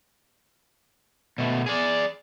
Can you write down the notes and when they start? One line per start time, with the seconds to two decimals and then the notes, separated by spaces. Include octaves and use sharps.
1.38 B2 A3
1.66 G#4 D5